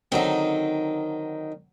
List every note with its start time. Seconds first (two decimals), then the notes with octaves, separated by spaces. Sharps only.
0.12 D3 D#3 F#3 C4 D#4